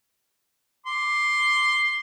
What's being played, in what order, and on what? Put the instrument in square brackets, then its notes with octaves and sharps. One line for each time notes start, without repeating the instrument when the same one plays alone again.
[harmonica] C6 D6